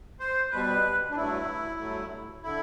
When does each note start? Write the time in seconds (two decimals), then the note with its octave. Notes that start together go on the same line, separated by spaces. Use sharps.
0.20 C5
0.51 B2 G3 B4
1.10 D4
1.16 G2 F#3 A3 E4
1.79 G2 F#3 A3
2.43 D3 E4